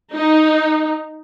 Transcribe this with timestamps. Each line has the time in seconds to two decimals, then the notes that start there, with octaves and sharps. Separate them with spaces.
0.14 D#4